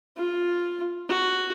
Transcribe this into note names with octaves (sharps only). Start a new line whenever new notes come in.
F4
F#4